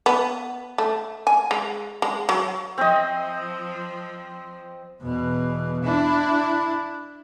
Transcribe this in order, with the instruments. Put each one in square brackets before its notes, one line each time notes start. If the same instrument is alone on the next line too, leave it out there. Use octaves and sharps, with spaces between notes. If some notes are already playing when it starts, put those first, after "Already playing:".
[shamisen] B3
A3
G#5
G#3
G#3
F#3
[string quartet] F3 [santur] C4 D#5
[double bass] E2 B2
D4 E4